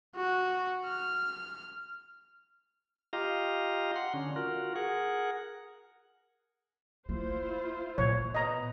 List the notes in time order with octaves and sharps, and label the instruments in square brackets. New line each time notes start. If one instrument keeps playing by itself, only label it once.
[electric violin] F#4
F6
[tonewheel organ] F4 G4 D#5 F5 A#5
F#5 C6
D3 C#4
F4 F#4 A#4
G#4 A#4 F#5
[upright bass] A#3 [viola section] E4 F4 C5
[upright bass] A#2 [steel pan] C#5
[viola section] B3 [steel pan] D#5 A#5